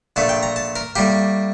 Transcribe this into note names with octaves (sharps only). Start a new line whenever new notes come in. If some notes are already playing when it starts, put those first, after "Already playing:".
A#1 A#2 A3 A5
G5
A#5
A5
A#4
A2 G3 A#3 G4